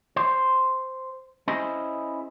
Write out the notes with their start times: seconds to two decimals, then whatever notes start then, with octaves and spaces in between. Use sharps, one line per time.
0.16 C5
1.48 C#4 E4 G#4 C5 D#5